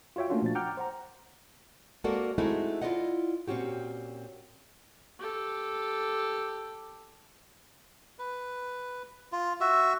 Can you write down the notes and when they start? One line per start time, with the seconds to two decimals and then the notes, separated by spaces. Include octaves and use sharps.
0.16 F4 F#4 C#5 E5 G5
0.30 A3 A#3 C#4 D4 F4 F#4
0.42 A#2 F3 D4 A6
0.55 F#5 G5 A#5 D6 F6 G6
0.77 C5 F#5 A#5
2.04 G#3 A#3 C4 F#4 A4 D5
2.38 G#3 A3 C4 D#4 E4 F#4
2.82 E4 F4 G4 D5 D#5 F#5
3.48 A#2 C4 C#4 F#4 G4
5.19 G4 A4
8.19 B4
9.32 F4
9.61 F#4 E5